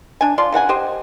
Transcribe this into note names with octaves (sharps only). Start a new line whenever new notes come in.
D4 G#5
F3 F4 D5 C6
C#3 E3 F#5 G#5
G4 C5 D#5